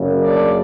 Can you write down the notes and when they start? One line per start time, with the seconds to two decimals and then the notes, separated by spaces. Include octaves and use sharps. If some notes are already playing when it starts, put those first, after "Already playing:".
Already playing: F#1 F#2 C#3 F#3
0.21 D4 D5